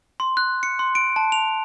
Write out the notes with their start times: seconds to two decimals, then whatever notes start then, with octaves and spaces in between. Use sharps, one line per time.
0.20 C6
0.37 F#6
0.63 C#7
0.79 C6
0.95 D7
1.16 A5
1.32 F7